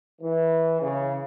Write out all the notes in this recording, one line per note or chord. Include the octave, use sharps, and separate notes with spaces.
E3
C#3